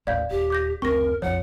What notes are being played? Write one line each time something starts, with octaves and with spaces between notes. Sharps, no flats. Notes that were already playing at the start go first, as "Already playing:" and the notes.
D#1 A1 D5 F5 G6
D#1 G4
D6 G6 A#6
F#1 D2 C4 A#4 C#6 A#6
A#1 F2 F3 C#5 F#5